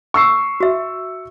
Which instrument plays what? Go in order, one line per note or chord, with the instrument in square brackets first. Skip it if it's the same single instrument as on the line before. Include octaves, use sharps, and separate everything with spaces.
[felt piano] C#6 E6 C7
[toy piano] F#4 E5